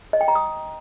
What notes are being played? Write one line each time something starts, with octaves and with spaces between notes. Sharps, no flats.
D#5
G5
A#5
D#6